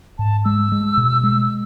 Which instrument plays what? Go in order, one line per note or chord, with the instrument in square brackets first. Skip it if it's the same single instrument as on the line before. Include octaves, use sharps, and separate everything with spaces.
[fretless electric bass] G#2 [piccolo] A5
[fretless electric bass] G#3 [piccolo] E6
[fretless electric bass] G#3
B2
G#3